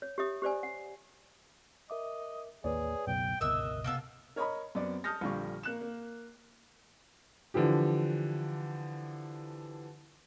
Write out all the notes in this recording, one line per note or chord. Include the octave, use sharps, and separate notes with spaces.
C#5
G4 C#5 E5 D#6
G4 C5 D5 G#5
F#5
A#4 D#5 E5 D6
A1 D#2 A#3 G#4 B4 C#5 D5
C#2 F#2 B2 G5
G1 C#2 B2 A#4 D#5 E5 E6 F#6
C3 A#3 B3 A4
A#4 C#5 D#5 A#5 B5
F#2 B3 C4 D5
A5 D#6 F6 G6 A#6
A#1 D3 G3 F4 C#6
A#3 F#6 E7
A#3
D3 E3 F3 G4